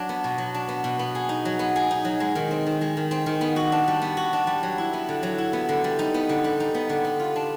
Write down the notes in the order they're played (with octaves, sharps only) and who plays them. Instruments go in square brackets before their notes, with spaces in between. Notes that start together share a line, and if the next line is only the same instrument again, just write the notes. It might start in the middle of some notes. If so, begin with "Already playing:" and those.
Already playing: [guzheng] F#3 D4
B3
B2
F#3
D4
B3
B2
B3
G#4
D#4
F#3
B3
G#4
D#4
F#3
G#3
D#3
C4
D#3
G#3
D#3
C4
D#3
B3
F#4
D4
G3
B3
F#4
D4
G3
F#3
E4
B3
D3
F#3
E4
B3
D3
G3
D#4
B3
D3
G3
D#4
B3
D3
B3
F4
D4